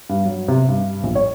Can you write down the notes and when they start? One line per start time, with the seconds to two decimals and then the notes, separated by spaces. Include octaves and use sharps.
0.09 G2
0.25 F#3
0.48 C3
0.68 G2
1.03 A#1
1.15 C#5